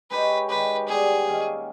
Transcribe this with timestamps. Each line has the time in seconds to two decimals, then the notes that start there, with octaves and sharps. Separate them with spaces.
0.10 G#3 D#4 G4 B4 C#5
0.49 D#3 G#3 D#4 G4 B4
0.88 G3 B3 G4 G#4
1.27 D#3 A#3 C#4 E4